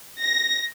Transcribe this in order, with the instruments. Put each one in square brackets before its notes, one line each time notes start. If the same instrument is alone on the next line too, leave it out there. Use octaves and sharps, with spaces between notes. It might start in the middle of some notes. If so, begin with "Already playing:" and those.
[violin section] A#6